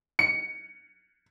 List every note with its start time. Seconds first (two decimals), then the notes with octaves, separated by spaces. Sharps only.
0.19 C#7